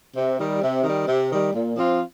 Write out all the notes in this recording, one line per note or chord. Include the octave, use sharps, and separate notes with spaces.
C3
D#3 G3
C3
D#3 G3
C3
D#3 G3
A#2
F3 C4 F4